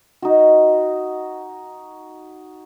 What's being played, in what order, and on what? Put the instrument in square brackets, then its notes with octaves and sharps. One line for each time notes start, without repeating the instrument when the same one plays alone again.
[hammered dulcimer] D#4 F#4